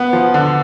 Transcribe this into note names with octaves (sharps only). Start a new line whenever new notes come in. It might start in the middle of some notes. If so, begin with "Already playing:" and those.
Already playing: B3
F3
D3